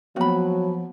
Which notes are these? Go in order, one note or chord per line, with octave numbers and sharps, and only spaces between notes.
F3 F#3 A#3 B3 F#4 B5